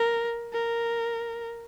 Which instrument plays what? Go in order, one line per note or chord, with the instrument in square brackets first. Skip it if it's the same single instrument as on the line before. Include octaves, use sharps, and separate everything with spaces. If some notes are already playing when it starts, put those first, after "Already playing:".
Already playing: [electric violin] A#4
A#4